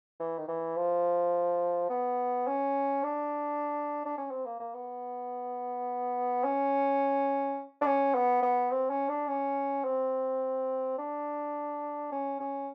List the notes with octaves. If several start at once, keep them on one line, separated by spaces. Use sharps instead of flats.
E3
D#3
E3
F3
B3
C#4
D4
D4
C#4
C4
A#3
A#3
B3
C#4
D4
C#4
B3
B3
C4
C#4
D4
C#4
C4
D4
C#4
C#4